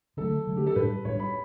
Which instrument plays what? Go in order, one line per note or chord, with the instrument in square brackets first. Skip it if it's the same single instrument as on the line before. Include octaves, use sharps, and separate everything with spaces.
[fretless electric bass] D3 F#3 A3 [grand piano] A4
[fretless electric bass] D3 F#3 A3
[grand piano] G4
A4
[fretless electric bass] A2 G3 D4 [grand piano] B4
[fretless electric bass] A2 G3 D4 [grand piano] C#5
[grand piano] B5